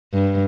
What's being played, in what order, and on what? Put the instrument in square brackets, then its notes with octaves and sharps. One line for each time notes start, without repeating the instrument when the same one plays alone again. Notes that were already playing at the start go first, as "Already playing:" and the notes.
[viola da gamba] G2